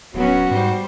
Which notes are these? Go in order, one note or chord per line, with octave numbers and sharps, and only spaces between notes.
D1 F#3 B3 C#4 F#4
G#2 G3 C5